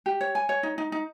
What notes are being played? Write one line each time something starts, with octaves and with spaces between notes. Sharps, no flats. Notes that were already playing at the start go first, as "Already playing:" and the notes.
G4
C#5
G#5
C#5
D#4
D#4
D#4